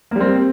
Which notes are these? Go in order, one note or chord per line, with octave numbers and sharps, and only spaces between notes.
G3 A#3 C4